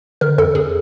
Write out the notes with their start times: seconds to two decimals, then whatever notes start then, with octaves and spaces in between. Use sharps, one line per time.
0.21 D3 A#4
0.38 F2 A4
0.55 F2 G#4